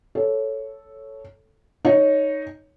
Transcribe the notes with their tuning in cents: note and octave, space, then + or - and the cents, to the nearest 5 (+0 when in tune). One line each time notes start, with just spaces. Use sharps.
A4 -5 C#5 +0
D#4 +0 C#5 +5